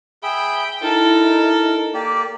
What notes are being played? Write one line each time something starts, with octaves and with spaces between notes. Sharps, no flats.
G#4 E5 G5 B5
D#4 E4 A4 A#4
A#3 G4 D5